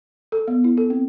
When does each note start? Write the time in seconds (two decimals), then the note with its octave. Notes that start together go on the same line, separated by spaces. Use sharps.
0.32 A4
0.48 B3
0.64 E4
0.78 A4
0.90 C4